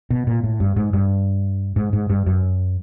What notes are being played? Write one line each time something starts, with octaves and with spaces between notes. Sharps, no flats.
B2
A#2
A2
G2
G#2
G2
G#2
G#2
G2
F#2